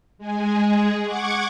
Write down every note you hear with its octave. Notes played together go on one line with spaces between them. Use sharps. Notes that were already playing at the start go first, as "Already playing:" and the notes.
G#3 G#4
F#5 C#6 D6 G#6